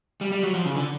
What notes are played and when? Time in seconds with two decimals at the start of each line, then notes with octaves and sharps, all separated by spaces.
0.21 G3
0.32 G3
0.43 F#3
0.55 F3
0.65 C#3
0.76 D3